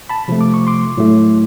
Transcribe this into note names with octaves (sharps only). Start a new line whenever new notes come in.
A5 B5
C3 F3 A3
D6
C#6
C6 D6
A2 F#3 A3